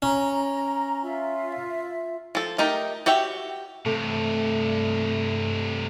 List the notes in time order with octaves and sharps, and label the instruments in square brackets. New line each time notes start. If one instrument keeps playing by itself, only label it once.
[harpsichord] C#4 [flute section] A#5
[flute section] F4 E5
[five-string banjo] F3 A4
A3 D#4 G4 A#4
F#4 G4 C#5 E5 G5
[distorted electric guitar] G2 C3 [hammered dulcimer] A3